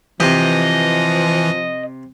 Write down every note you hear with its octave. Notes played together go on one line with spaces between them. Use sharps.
C3 E3 F3 G4 D#5